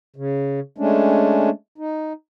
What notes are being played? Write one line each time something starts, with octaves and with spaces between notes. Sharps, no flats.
C#3
G#3 A3 C#4 D4
D#4